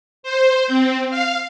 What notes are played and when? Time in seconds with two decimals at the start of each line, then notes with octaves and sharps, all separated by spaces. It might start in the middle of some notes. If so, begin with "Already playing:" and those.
0.23 C5
0.68 C4
1.10 F5